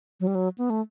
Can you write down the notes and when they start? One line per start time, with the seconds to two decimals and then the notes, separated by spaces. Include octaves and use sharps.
0.20 F#3
0.27 G3
0.35 F#3
0.58 B3
0.70 A3